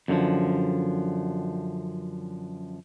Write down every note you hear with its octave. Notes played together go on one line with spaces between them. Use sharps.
F#2 D3 E3 F3